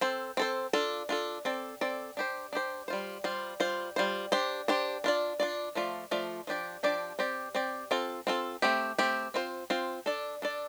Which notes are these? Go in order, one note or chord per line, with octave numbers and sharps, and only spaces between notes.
C4 A4 C5
C4 A4 C5
D4 F4 A4
D4 F4 A4
C4 A4 D5
C4 A4 D5
D4 G4 C5
D4 G4 C5
G3 F4 C5
G3 F4 C5
G3 F4 C5
G3 F4 C5
D4 G4 C5
D4 G4 C5
D4 F4 D5
D4 F4 D5
F3 A3 F4 D5
F3 A3 F4 D5
F3 D4 G4 D5
F3 D4 G4 D5
C4 G4 D5
C4 G4 D5
C4 F4 A4
C4 F4 A4
A3 C4 G4
A3 C4 G4
C4 F4 C5
C4 F4 C5
D4 A4 D5
D4 A4 D5